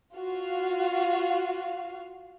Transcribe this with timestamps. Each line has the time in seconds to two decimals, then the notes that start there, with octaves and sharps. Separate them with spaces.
0.15 F4 F#4 F5